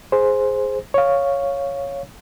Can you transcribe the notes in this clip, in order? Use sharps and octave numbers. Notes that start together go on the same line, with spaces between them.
G#4 C5
C#5 F5